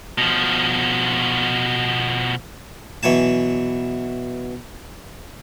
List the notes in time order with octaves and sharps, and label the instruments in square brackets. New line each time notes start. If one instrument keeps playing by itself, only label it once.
[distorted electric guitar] B2 F3
[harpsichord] B2 E3 F#3 G#5 A5